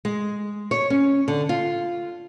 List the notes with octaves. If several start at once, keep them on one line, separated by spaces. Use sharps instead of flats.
G#3
C#5
C#4
D3
F4